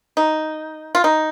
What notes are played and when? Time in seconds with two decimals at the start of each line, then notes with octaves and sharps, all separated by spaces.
0.17 D#4
0.95 F4
1.04 D#4